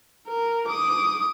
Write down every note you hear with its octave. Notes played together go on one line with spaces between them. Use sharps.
A#4
D6 D#6